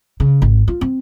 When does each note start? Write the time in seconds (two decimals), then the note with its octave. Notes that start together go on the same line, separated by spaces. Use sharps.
0.20 C#3
0.42 G#1
0.68 F4
0.81 C4